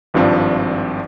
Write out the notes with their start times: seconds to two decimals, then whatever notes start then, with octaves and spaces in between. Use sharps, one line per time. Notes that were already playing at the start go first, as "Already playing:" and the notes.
0.14 G#1 G2 F3 C4 D4